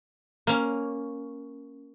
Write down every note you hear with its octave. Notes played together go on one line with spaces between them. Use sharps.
A#3 C#4